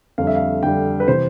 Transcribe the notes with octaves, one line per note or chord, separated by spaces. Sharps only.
F2 D3 G3 D4 F5
E5
F5
F2 D3 G3 D4 G5
B4
C3 E3 C5